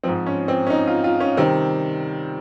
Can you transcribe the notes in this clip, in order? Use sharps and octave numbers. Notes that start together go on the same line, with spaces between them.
G#2 F3 C4
C#4
C4
C#4
D#4
F4
F4
C#4
C3 D#3 G3 C4